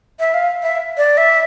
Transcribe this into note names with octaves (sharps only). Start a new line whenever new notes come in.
E5
F5
E5
D5
E5